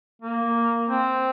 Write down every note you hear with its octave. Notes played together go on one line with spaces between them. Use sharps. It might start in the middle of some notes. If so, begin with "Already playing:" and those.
A#3
C4